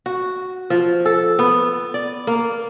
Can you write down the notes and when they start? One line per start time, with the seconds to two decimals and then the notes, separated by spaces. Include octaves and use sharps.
0.06 F#4
0.70 F3
1.05 A4
1.39 B3
1.94 D5
2.27 A#3